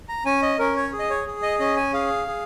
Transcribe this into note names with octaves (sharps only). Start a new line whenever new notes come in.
A#5
C#4 G#5
D#5
C#4 A#4
C#5
G#4
D#5
C#5
G#4
D#5
C#4 D#5
G#5
G#4 F5
G#4